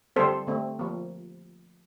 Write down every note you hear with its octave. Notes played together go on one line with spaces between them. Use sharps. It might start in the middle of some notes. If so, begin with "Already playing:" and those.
D3 G3 C4 A4 C5
D3 A3 C4
F3 A#3